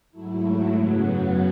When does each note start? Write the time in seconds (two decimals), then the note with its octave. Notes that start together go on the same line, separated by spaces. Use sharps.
0.11 G#2 F#3 A3 E4
0.73 F#2 C#3 F#3 B3 F#4